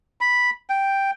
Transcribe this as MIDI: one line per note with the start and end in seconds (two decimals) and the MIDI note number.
0.21 0.50 83
0.70 1.11 79